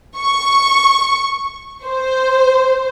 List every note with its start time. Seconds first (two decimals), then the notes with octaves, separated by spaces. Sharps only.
0.18 C#6
1.85 C5